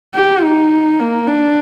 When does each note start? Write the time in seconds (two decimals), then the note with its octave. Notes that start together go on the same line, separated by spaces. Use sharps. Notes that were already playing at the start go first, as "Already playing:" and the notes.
0.14 G4
0.43 D#4
0.99 A#3
1.27 D4